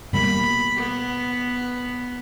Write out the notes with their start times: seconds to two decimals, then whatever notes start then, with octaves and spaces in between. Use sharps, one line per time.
0.13 B2 G3 A#3 B5
0.76 B3